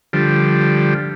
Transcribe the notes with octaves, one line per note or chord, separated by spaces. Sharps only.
D3 F3 G3